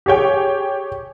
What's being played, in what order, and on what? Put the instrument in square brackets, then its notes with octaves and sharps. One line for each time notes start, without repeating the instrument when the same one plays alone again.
[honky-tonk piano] G4 G#4 C#5 G5